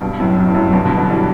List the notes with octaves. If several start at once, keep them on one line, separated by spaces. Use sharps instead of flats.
G2 B2
F#2 A2
F#2 A2
G2
F#2 A2
G2 B2
B2 D3
D3 F#3
E3 G3